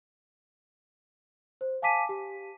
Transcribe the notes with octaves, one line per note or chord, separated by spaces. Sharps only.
C5
F5 G#5 A5 D6 B6 D#7
G4